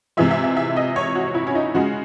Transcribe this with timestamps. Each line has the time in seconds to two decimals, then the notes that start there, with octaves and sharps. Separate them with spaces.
0.17 C3 E3 G#3 E5
0.31 E5
0.44 E5
0.57 E5
0.76 D#5
0.96 C#5
1.15 F#4
1.35 E4
1.47 C#4
1.55 D#4
1.74 C#3 G#3 F#4